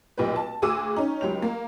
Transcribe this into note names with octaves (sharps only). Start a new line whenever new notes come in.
F1 B1 A#2 G4 B4
A5
D2 F#4 G#4 D6 E6 D#7
C#4 D#4
C#2 F#3 G4 F7
A#3